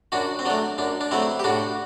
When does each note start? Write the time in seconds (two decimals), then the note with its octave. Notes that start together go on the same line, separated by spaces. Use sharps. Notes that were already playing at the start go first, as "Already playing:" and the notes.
0.12 F#2 D4 F#4
0.39 C4
0.45 F#3 A3 D4
0.78 F#2 D4
1.01 D4
1.11 F#3 A3 C4 E4
1.39 G4
1.44 A2 D4 F#4